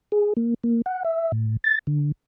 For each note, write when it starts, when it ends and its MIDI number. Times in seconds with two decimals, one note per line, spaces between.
0.12 0.33 68
0.37 0.54 58
0.64 0.82 58
0.86 1.03 78
1.05 1.32 76
1.32 1.57 45
1.64 1.79 93
1.87 2.12 50